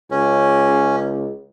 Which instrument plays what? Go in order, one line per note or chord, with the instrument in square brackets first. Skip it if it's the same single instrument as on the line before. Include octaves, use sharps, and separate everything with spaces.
[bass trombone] C#2 [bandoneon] C#4